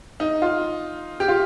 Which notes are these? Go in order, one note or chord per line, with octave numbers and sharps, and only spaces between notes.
D#4
F4
G4
F4